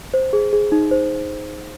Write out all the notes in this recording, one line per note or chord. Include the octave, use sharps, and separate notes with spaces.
C5
G#4
G#4
D#4
C5